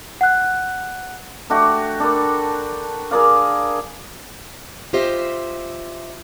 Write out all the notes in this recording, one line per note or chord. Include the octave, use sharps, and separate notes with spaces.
F#5 F#6
A3 D4 F#4 G4
D4 A4 A#4 B5
G#4 A#4 D5 F5
F4 G4 C5 D#5 E5